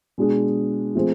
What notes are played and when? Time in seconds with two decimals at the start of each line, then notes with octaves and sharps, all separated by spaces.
0.18 B2 G#3 D4 G#4
0.95 F3 A3 C4 G#4